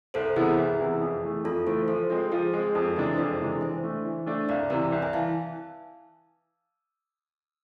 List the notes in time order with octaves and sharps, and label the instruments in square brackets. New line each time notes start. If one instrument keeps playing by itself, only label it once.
[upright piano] C2 [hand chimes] A4 C5
[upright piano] C3 E3 B3 E4 [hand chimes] G#4 B4
[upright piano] C2
C3 E3 B3 E4
F2
E3 A3
[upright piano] F2 [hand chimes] F4 A4
[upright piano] E3 A3 [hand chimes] A4 C5
[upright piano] F3 [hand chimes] A4 C5
[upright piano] G#3 C4 [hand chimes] F4
[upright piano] F3 [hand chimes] G#4
[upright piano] G#3 C4 [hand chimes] G#4
[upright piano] F2 [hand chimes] F4 A4
[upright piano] C3 E3 G#3 D4 [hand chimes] G#4 B4
[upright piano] F2 [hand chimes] A4 C5
[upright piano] C3 E3 G#3 D4
[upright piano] E3 [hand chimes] C5 E5
[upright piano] A3 D4
E3
A3 D4
[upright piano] C2 [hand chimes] D5 F5
[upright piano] C3 E3 [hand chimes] B4 D5
[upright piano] C2
[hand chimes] E5 G#5
[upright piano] E3 [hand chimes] F5 A5